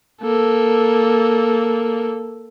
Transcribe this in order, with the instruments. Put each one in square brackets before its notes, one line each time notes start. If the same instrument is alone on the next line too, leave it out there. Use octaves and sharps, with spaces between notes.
[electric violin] A#3 A4